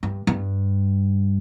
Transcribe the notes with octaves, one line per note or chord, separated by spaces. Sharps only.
G2
G2